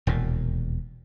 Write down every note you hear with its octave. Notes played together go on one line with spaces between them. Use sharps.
E1 D#2 A#2